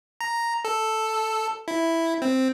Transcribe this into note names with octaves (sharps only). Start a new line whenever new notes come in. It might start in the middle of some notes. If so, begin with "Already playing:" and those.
A#5
A4
E4
C4